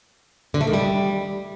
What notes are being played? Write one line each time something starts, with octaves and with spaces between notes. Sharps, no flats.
D3
A3
D#3
G3